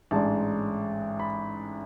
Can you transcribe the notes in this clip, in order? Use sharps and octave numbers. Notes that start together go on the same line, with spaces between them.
A1 G#2 G#3 D4 A5
B5